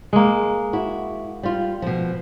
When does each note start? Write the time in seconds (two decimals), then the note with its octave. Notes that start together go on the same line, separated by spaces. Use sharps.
0.13 G#3 A#3
0.73 E4 F#4
1.43 G3 F4
1.82 B2 F3